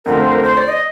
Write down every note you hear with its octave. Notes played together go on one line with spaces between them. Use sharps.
F2 D3 A3 C4 F4 A#4
C5
A#4
C5
D5
D#5